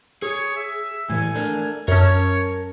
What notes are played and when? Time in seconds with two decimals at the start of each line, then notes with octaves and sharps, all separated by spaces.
0.22 G#4 C#5
0.56 E5
1.10 A2 E3 A3 G#5
1.34 A3 D4 A#4
1.88 F#2 C#4 A#4 C#5 A5